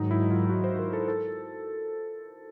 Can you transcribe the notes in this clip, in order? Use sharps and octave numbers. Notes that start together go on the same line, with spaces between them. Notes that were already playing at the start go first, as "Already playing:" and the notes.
Already playing: G#2 D#3 F#3 D#4
E4
F4
F#4
C5
A#4
A4
A4